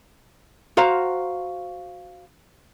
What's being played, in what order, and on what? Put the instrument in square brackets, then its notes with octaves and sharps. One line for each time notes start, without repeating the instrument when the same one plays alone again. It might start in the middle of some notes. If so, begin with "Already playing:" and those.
[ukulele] F#4 C5 F5 A#5